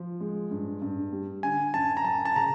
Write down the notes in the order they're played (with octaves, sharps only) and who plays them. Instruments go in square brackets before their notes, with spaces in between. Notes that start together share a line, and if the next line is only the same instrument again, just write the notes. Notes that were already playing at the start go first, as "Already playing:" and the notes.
Already playing: [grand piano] F3
G#3
G2
G2
G3
[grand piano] D3 [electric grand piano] G#5
[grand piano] F#2 [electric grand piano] A5
[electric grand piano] A#5
[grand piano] F#2 [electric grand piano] A5
[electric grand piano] A5
[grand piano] C#3 [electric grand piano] A#5